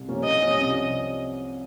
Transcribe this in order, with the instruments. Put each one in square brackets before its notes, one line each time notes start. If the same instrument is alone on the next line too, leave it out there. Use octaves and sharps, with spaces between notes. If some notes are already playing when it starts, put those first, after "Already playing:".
Already playing: [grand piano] C2
C3 F3 A#3 C#4
[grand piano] C2 [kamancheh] D#5
[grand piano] C3 F3 A#3 C#4
C2
C3 F3